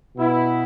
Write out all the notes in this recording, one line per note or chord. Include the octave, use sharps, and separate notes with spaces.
B2 B3 E4